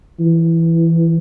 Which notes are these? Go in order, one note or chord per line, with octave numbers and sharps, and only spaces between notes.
E3